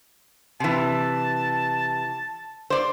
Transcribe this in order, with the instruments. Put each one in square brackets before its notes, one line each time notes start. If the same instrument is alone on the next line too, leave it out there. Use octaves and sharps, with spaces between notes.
[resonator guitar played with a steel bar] C3 E3 [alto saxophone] A5
[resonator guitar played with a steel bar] C5 D5